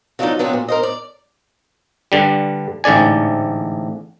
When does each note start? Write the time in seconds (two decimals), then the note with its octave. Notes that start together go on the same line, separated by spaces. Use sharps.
0.19 D3 F3 F#3 B3 D4 D#4
0.39 C3 F3 F#3 B3 D4
0.53 A#2
0.68 A#4 C5 D#5
0.83 D5
2.12 G2 D3 G3
2.84 A1 G#2 D3 D5 G#5